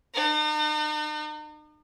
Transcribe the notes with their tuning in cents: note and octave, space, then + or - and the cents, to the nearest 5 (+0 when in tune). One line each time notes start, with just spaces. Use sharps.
D#4 -45